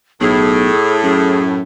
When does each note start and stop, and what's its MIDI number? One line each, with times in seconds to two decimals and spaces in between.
0.21 0.70 35
0.21 1.58 45
0.21 1.00 68
1.03 1.63 42
1.03 1.42 68